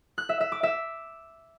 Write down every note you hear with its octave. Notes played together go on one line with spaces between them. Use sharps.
F#6
E5
E5
D6
E5